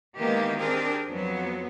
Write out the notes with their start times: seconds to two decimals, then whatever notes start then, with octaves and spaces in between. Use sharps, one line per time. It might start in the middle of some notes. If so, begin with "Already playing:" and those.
0.16 D#3 E3 G#3 A#3 B3 G4
0.58 C4 D4 G4 G#4 A#4
1.09 F2 F#3 B3